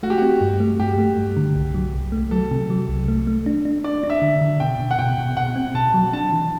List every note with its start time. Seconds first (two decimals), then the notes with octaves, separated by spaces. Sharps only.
0.03 A3 F#4
0.10 G4
0.18 C4 F#4
0.41 G2
0.60 A3
0.79 G2 G4
0.98 A3
1.17 G2
1.37 D3
1.56 C2
1.75 F#3
1.94 C2
2.12 A3
2.31 F#3 A4
2.51 C3
2.70 F#3
2.89 C2
3.08 A3
3.27 A3
3.46 D4
3.65 D4
3.84 D4 D5
4.03 D4
4.10 E5
4.22 D3
4.41 D3
4.60 B2 G5
4.79 B2
4.91 F#5
4.99 B2 G5
5.18 B2
5.37 B2 F#5
5.56 C4
5.75 B2 A5
5.94 F#3
6.13 D4 A5
6.32 E3